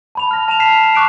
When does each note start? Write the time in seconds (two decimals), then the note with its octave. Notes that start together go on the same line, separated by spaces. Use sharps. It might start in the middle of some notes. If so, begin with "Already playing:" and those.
0.15 A5 B5 F7
0.31 F6 A#6
0.48 A5 E7 F7
0.60 F6 B6 C7 E7 F7
0.83 C7
0.95 C#6 D6 F#6 C7 D7